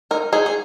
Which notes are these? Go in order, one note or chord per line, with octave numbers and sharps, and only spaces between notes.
D#4 A#4
D#4 G#4
G#4